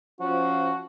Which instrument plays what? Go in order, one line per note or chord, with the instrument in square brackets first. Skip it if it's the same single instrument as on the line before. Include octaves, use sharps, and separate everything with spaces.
[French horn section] F3 C#4 [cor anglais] F#4